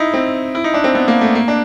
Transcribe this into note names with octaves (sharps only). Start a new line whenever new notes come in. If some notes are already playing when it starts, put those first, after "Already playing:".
Already playing: D#4 E4
C4
E4
D#4
D4
C4
B3
A#3
A3
A#3
D4